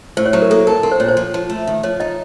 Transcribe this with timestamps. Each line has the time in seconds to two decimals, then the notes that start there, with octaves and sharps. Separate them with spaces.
0.17 A2 C5
0.26 C#5
0.33 F#3 C5
0.42 A#4
0.50 A#3 A4
0.67 A4 A#4
0.83 C4 A#4
0.92 C5
1.00 A#2 C#5
1.09 C5
1.17 F3
1.34 F3
1.50 A3
1.67 D#3
1.83 F3 C#5
2.00 D#4 D#5